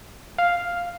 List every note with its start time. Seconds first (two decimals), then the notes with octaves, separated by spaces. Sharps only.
0.38 F5